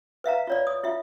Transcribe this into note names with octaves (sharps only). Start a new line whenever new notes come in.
B4 E5 F5 A#5
F4 C#5 D5
D#6
E4 F4 E5